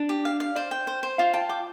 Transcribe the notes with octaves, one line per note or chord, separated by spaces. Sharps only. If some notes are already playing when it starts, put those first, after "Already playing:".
Already playing: D4
G4
F5
F5
C5 D5
G5
C5
C5
F4 F5
G5 A5
G5 D6